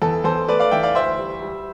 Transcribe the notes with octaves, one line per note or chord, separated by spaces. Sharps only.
E2 A4
E2 A4 C5
A3 B4 D5
D5 F5
E3 E5 G5
D5 F5
D2 C5 E5
G3
G3